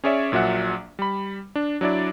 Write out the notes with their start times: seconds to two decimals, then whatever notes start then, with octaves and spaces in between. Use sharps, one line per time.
0.04 C#4 G#4 C#5 D5 E5
0.32 A#1 A#2 F#3 E5 F#5
0.99 G3 B5
1.56 D4
1.81 F#3 D4 E4 D5